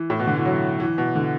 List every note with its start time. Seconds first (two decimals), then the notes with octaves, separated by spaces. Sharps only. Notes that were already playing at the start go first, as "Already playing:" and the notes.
Already playing: E3
0.10 A2
0.20 B2
0.27 D3
0.36 E3
0.45 F#3
0.80 E3
0.98 B2
1.15 D3